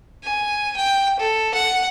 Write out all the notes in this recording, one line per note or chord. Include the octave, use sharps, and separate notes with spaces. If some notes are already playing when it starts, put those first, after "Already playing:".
G#5
G5
A4
F#5